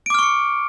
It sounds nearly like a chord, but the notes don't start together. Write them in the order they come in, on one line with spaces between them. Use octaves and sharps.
D7 D6 F6 C#6 C#7